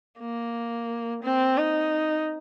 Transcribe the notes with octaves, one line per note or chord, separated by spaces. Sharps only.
A#3
C4
D#4